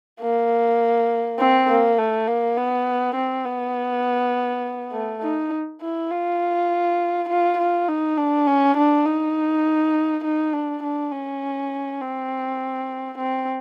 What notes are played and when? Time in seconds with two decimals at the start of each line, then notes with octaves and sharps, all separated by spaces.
0.21 A#3
1.39 C4
1.69 A#3
1.98 A3
2.28 A#3
2.57 B3
3.16 C4
3.45 B3
4.92 A3
5.22 D#4
5.81 E4
6.11 F4
7.29 F4
7.59 F4
7.88 D#4
8.17 D4
8.47 C#4
8.77 D4
9.06 D#4
10.25 D#4
10.53 D4
10.83 D4
11.12 C#4
12.01 C4
13.18 C4